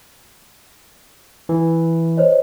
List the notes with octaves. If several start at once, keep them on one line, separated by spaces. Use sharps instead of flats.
E3
C5 C#5 D#5